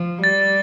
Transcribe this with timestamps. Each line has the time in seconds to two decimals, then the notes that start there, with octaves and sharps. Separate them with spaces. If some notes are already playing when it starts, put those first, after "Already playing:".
Already playing: F3
0.23 G3 A6